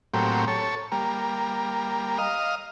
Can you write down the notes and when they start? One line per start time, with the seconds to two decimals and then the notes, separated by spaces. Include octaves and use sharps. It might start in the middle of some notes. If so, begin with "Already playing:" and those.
0.14 A2 F#3 A#3 C4 G4
0.48 A4 C#5
0.92 G3 A#3
2.18 D#5 F5